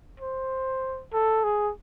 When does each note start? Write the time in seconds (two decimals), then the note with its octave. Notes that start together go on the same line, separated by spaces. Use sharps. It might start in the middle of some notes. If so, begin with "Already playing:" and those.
0.20 C5
1.13 A4
1.44 G#4